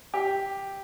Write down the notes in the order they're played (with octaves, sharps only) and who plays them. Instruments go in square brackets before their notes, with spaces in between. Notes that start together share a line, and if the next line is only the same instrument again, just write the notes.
[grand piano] G4